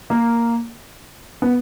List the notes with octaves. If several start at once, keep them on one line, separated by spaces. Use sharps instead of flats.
A#3
B3